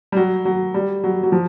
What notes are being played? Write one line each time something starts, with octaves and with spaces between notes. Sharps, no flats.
G3
F#3
F#3
G3
F#3
F#3
F3